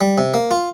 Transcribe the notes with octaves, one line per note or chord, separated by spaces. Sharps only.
G3
C3
A#3
F4